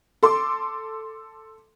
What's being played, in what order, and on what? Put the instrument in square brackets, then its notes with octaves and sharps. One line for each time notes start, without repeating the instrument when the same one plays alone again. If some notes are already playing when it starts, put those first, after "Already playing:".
[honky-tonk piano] A4 C6 D6